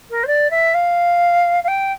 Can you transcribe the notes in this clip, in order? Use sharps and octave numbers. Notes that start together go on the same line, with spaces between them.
A#4
C5
D5
E5
F5
F5
G5